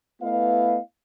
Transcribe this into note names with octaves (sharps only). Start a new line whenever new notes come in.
A3 B3 E4 B4 D#5 F5